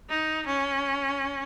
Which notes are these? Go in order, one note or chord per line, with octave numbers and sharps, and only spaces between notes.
D#4
C#4